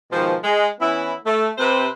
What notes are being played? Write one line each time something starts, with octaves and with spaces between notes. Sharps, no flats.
G#2 B2 D#3 F3
G#3
E3 B3 C#4 E4
A3
C3 B4 C5